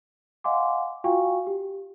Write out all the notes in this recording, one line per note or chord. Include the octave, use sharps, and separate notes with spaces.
D#5 F5 F#5 G#5 C6 D6
F4 F#4 F5 G5 G#5 C#6
G4